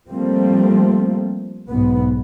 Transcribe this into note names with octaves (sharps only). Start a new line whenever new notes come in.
F3 G3 A3 A#3 C4
B1 G#2 B3